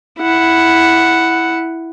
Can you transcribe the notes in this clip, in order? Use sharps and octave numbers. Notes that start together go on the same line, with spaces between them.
E4 F#5